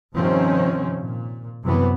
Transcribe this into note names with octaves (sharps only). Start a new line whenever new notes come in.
G2 C3 D#3 F3 C4 C#4
A#2
F#2 C3 E3 B3